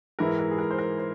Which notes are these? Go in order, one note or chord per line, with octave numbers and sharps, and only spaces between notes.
G#2 E3 G#3 E4 A#4
A#4
G#4
A#4
C5
A#4
C5